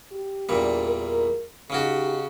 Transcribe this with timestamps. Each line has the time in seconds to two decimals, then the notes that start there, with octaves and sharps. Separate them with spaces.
0.11 G4
0.49 E2 A#2 G3 D4
0.86 A#4
1.70 C#3 C#4 D#4 F#4 G4